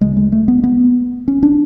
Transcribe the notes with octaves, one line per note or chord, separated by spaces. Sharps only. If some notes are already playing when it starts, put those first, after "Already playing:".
D2 C#3 G#3
G#3
A3
B3
B3
C#4
D4